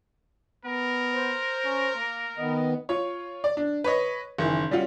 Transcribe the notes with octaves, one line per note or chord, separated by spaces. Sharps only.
B3 A#4
C5
C#4
A#3
D#3 B3 D#5
F4 C#5
D5
D4
B4 C#5 D#5
F#1 D#3 E3
G3 C#4 F4 F#4